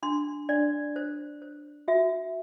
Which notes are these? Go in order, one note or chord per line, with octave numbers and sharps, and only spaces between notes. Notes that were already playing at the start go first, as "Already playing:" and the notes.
D4 C6
D4 D5
C5
C5
F#4 E5